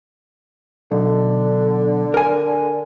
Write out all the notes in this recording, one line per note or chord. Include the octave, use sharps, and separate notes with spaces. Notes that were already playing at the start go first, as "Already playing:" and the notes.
B1 D3
A#4 G#5